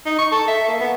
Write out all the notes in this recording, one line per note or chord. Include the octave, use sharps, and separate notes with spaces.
D#4
C#6
A4
E5
A#3
B3